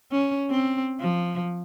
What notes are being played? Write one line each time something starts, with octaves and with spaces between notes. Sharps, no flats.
C#4
C4
F3